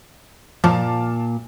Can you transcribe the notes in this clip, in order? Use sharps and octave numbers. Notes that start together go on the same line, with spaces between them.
A#2 F3 F5 A5 D6